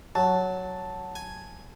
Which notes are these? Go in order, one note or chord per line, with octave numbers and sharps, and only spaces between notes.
F#3 A5
G#5